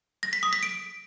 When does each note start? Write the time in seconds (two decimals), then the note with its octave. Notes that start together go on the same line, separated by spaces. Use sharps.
0.23 A#6
0.33 B6
0.43 D#6
0.53 B6
0.63 D7